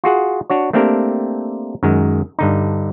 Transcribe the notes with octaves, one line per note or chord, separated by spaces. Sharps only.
F4 F#4 G#4 F#5
D4 F#4 C#5
A3 A#3 C4 D4 G4 A#4
F#2 D#3 G#3
G2 D3 D#4